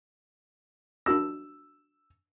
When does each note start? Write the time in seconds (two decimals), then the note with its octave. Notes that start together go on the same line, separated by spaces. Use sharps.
1.06 D4 F#4 E6 A#6